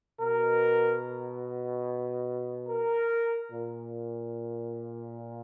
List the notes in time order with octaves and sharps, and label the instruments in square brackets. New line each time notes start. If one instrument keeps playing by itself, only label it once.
[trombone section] B2 A#4
A#4
A#2